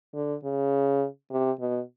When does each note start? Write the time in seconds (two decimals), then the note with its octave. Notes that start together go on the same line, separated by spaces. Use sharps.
0.14 D3
0.44 C#3
1.31 C3
1.60 B2